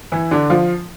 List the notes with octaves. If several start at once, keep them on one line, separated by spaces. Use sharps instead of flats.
E3 E4
D3 D4
F3 F4